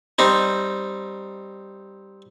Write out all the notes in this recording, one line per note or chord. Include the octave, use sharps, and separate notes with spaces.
G3 C4 D#4